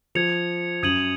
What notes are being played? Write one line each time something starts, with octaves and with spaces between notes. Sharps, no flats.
F3 G#6 C#7 F7
F#2 D#6 G#6 D#7 F#7